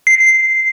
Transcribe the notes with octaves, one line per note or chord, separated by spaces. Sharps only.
C7